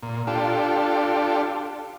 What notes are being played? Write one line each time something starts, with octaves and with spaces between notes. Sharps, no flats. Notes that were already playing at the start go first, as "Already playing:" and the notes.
A#2
D4 F4 G4 A4